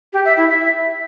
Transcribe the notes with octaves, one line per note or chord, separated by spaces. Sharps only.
G4
E5
E4
E5